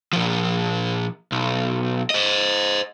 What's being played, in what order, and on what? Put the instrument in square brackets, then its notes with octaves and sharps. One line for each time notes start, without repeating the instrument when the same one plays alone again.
[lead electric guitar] A#2 F3
B1
C5 D#5